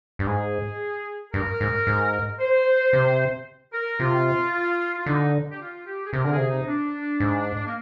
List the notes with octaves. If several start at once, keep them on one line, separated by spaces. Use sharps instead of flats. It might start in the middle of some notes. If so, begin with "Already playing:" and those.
G2
G#2 G#4
G2 A#4
G#2
G#2
C5
C3
A#4
C3 F4
F4
D3 D#4
D4
G4
F4
G4
G#4
C3 A#4
D3 A#4
C3 G#4
D#4
D4
G#2
A#3